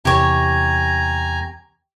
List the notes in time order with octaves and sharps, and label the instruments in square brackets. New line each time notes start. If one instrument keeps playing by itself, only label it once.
[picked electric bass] E2 C3 [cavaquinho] G4 C#5 [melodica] G#5 A#5